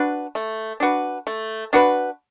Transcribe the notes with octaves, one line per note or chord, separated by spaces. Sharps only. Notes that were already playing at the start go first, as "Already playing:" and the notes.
Already playing: D4 F#4 B4
A3
D4 F#4 B4
A3
D4 F#4 B4